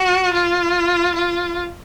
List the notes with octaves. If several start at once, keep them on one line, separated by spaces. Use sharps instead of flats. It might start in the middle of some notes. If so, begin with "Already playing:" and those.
Already playing: F#4
F4
F4